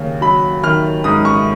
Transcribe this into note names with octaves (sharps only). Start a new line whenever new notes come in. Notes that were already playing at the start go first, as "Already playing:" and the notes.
Already playing: D#2 C#3
F#3 B5
D#3 F6
G#2 D#6
C#6